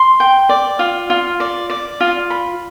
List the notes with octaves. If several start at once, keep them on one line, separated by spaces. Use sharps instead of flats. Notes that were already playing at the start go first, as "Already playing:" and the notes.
Already playing: C6
G5
D5
F4
F4
D5
D5
F4
B5